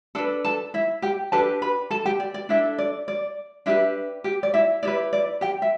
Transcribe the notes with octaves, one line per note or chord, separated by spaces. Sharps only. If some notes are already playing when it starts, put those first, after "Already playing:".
D4 A4 B4 A5
A4 A5
E4 E5
G4 G5
D4 G4 A4 B4 A5
B4 B5
A4 A5
G4 G5
D5
D5
D4 E4 A4 E5
D5
D5
D4 E4 G4 B4 E5
G4 G5
D5
E4 E5
E4 G4 B4 D5
D5
G4 G5
E5